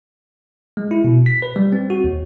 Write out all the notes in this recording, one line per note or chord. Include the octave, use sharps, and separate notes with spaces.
G#3
E4
B2
B6
B4
G3
C4
F#4
D#2